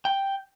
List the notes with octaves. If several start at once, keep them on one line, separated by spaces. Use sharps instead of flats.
G5